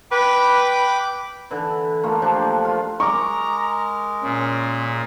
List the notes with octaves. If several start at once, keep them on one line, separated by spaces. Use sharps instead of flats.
B4 G5 B5 D6
D3 E3
A3 A#3 F4
F3 D4 G4
F4
G#3 A#4 A#5 C#6 D6
A#2 C#4